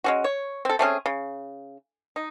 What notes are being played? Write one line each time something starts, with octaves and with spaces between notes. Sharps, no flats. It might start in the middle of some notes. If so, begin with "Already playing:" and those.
G#3 C#4 F#4
C#5
C4 A4
A3 C4 C#4 G#4
C#3
D#4